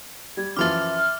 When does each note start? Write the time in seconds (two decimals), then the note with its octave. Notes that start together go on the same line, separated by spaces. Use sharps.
0.37 G3 G#6
0.56 F#2 E3 F3 E5 C6 D6 F6